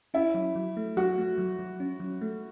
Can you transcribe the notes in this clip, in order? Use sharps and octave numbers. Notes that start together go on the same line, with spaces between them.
C#4 E4
F#3
F#3
A3
F#3 F#4
A3
F#3
F#3
C#4
F#3
A3